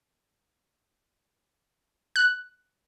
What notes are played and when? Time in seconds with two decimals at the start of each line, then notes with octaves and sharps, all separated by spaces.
2.16 F#6